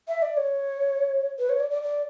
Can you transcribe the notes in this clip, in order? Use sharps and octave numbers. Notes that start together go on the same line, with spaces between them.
E5
D5
C#5
B4
C#5
D5
D5
D5